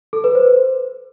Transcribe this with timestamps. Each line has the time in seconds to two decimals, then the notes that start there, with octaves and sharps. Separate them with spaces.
0.13 A4
0.24 B4
0.35 C5